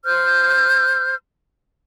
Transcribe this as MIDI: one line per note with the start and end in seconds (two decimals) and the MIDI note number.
0.05 1.15 72
0.05 1.15 89
0.05 1.15 91